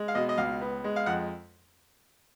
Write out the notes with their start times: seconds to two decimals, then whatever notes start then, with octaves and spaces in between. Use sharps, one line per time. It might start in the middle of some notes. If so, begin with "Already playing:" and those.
Already playing: G#3
0.08 F5
0.15 B2 D#5
0.29 D#5
0.37 C#2 F5
0.61 B3
0.84 G#3
0.96 F5
1.06 F2 F#5